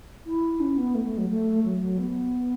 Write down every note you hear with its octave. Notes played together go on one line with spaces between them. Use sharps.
E4
C#4
B3
A3
A3
F#3
A3
F#3
F#3
B3